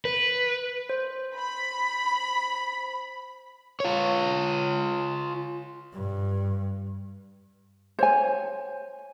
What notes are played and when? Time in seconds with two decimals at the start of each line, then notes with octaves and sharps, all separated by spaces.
0.05 B4
0.90 C5
1.37 B5
3.80 F4 C#5
5.93 G2
7.99 C5 C#5 G#5